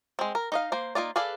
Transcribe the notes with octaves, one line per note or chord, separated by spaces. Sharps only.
G#3 C4
A#4
D#4 D#5 F5
A#3 C5
A#3 D#4 F4 D5
G#4 A4 B4 D5 F5